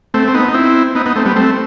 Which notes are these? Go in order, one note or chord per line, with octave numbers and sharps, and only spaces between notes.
A3 C4
C4
B3 D#4
D#4
C4 E4
B3 D#4
B3 D#4
A3 C4
G3 B3
A3 C4